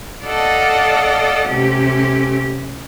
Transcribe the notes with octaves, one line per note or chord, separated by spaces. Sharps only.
A4 D5 D#5 F5 F#5 A5
C3 A3 C#4 G4